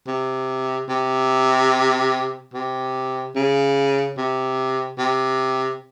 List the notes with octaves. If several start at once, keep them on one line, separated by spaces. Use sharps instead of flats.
C3
C3
C3
C#3
C3
C3